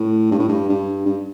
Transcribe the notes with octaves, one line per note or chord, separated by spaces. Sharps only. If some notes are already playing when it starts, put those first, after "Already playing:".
Already playing: A2
G2
A2
G2
G2
G2